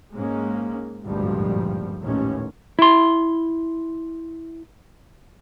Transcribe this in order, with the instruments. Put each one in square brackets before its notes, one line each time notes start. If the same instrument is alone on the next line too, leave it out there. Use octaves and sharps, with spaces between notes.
[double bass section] G#2 G#3 A#3 C#4
G#1 D2 G2 A#2 F3 G3
A1 D#2 A#2 C#4
[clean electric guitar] E4 C6